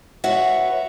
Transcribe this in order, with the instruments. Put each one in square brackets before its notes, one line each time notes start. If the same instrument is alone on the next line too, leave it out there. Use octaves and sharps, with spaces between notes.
[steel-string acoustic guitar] F#4 B4 C#5 E5 F#5